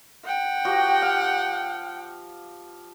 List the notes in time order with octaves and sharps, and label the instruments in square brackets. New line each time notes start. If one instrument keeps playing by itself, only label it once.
[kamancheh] F#5 G5
[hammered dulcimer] F3 F#4 G4
F5